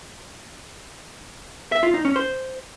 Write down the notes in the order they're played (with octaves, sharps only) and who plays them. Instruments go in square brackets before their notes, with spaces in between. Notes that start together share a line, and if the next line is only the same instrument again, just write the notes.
[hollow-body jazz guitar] E5
F4
D#4
C#4
C5